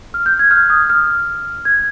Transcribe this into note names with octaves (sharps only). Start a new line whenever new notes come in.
F6
G6
G#6
F6
D#6
F6
G#6